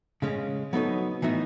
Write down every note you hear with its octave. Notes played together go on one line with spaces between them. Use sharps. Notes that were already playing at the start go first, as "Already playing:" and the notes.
C#3 G#3 C#4
F#3 B3 D#4 A4 C#5
A2 E3 B3 D#4 F#4